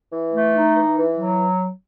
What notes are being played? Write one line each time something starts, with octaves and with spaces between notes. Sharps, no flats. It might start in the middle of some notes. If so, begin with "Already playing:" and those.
E3
A3
D#4
E3
E3
F#3